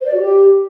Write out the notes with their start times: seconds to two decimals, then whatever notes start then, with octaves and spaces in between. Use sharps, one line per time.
0.01 C5
0.07 D5
0.13 F#4
0.19 G4